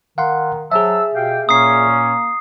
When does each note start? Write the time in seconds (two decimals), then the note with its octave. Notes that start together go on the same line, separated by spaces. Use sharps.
0.18 D#3 F5 F#5 C6
0.72 F#3 G#4 C5 E5 A5 E6
1.15 B2 G4 F5 G5
1.49 A#2 A#3 C#4 D#6 C7